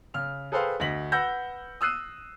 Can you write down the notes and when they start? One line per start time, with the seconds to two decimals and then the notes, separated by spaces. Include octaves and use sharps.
0.14 C#3 F6 F7
0.52 G#4 A4 B4 C5 F5 G5
0.80 D2 D#5 A#6 B6 F#7
1.12 B4 F#5 B5 E6 G6 A#6
1.81 D#6 E6 F#6 C7 D#7